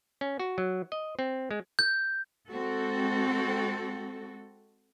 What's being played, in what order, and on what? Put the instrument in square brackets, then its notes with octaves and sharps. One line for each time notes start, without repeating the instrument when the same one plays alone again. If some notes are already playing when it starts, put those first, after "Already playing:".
[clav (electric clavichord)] C#4
F#4
F#3
D#5
C4
G#3
[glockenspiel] G6
[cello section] G#3 C4 F#4 A4